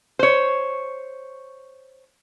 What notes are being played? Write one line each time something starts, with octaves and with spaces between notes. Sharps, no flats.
C5 C#5